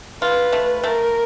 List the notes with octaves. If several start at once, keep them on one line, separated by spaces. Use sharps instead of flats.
F4 B4
A3
A3 A#4